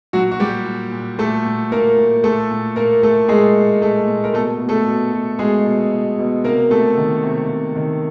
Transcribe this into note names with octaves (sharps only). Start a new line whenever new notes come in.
A#2 F#3 F#4
F#4
A#2 G3 G4
A#2
A#2
A#2 A3 A4
A#2
A#2 A#3 A#4
A#2
A#2 A3 A4
A#2
A#2 A#3 A#4
A#2 A3 A4
A#2 G#3 G#4
A#2
A#2 A3 A4
A#2
A#4
B2 A3 A4
B2
A3 A4
B2
B2
B2 G#3 G#4
B2
B2
B2
C3 A#3 A#4
C3 A3 A4
D#3
C3
C3
D#3